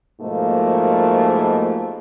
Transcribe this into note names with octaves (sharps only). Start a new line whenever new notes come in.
G#2 B2 F3 A3 A#3